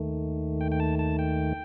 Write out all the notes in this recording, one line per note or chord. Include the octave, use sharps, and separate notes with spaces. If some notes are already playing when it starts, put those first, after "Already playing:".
Already playing: D#2 D#3 A3
G5
G5
A5
A5
G5